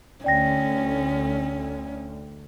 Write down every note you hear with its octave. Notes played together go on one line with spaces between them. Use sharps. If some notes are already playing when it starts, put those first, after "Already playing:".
D2 C#4 D5 G5 A#6